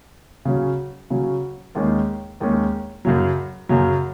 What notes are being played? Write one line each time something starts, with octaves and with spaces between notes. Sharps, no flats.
C#3 F#3 C#4
C#3 F#3 C#4
D#2 D#3 G#3 C#4
D#2 D#3 G#3 C#4
F#2 C#3 F#3
F#2 C#3 F#3